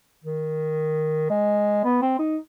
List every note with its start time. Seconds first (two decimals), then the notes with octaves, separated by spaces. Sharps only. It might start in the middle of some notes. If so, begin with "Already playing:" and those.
0.24 D#3
1.30 G#3
1.84 B3
2.02 C4
2.19 D#4